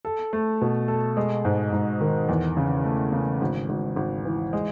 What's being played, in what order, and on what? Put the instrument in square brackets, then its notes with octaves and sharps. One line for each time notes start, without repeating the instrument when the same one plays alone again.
[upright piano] A4
A3
B2
A4
G#3
G#2
G#2
D#3
E2
C#3
A3
C#3
G#1
G#1
G#1
E3
G#3